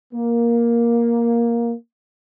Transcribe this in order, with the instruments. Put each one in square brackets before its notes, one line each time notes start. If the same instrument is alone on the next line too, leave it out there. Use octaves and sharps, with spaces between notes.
[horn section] A#3